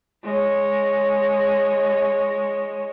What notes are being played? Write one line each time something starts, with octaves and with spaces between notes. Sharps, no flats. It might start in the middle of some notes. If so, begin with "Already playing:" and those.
G#3 C#5